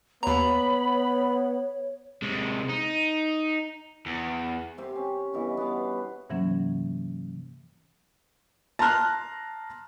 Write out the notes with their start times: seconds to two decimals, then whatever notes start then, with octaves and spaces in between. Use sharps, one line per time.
0.23 D#2 B3 C#5 A#5 B5
2.22 C3 G#3
2.69 D#4
4.06 E2
4.78 C3 C4 G4
4.96 C#4
5.33 G2 B2 E3
5.57 B3 F5
6.30 G2 C3 E3 F#3 A#3 C#4
8.79 A5 A#5 C6 F6 F#6